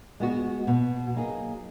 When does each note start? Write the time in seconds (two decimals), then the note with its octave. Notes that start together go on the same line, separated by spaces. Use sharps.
0.20 G#3 B3 F#4
0.67 B2
1.15 F#3 A#3 D#4 G#4